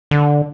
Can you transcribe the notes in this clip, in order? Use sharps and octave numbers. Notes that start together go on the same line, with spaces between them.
D3